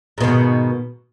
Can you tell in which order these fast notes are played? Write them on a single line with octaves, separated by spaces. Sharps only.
G#2 B2 D#3